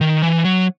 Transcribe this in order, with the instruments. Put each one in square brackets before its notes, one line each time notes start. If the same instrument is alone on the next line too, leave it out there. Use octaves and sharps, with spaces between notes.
[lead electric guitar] D#3
E3
F#3